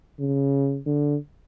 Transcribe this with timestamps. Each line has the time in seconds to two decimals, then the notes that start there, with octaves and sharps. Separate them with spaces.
0.20 C#3
0.86 D3